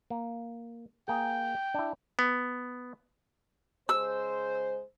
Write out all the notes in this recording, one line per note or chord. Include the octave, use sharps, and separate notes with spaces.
A#3
A#3 G#4 G5
D4 E4
B3
C#3 G#3 C5 E6